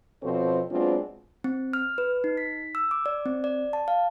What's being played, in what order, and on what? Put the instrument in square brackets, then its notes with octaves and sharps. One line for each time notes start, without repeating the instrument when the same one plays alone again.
[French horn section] B2 F3 C4 A4 C5 C#5
F#3 G#3 B3 C4 D4 F4
[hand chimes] C4
F6
B4
D#4
B6
E6
D6
D5
C4
D5
A5
F5